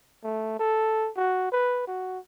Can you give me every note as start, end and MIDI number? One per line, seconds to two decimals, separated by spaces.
0.24 0.58 57
0.59 1.10 69
1.16 1.51 66
1.52 1.86 71
1.87 2.19 66